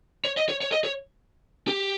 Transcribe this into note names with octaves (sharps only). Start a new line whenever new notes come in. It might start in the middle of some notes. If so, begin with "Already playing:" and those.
C#5
D#5
C#5
C#5
D#5
C#5
G4